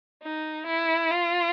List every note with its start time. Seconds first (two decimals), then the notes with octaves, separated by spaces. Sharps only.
0.23 D#4
0.67 E4
1.11 F4